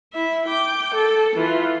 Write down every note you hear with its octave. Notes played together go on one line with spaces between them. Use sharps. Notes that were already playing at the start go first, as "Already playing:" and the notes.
E4 E5
G5 D6
A4
E3 F4